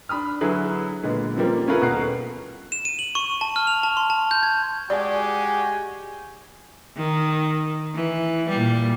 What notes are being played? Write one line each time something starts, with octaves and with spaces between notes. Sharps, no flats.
D4 B5 D#6 F6
D3 F#3 E4 G#4 B4
A#2 D3 G#3 B3
C#3 F3 G3 A#3 C4
C#4 E4 F4 G#4 A#4 B4
D#1 B2 F#5 A#5 F#6 C7
E7
D#7
F#7
C#6
A5
F6
F7
A5
C6
A5
G6
G#6
G#3 F#4 G4 D5 G#5
D#3
E3
A#2 G3